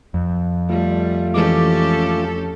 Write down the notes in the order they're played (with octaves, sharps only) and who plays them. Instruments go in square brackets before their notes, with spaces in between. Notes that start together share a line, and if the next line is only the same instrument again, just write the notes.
[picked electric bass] F2
[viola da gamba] G3 [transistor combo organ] A3 F4
[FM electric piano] E3 G#3 D6 [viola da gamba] C#4 G4 A4